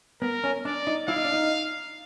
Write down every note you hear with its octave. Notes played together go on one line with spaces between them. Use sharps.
B3 A#4
C#4
D4 D5
D#4
E4 F5
D#4
D4
D#4